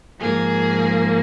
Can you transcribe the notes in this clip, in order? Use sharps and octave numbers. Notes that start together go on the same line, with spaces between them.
G#2 F3 A#3 G#4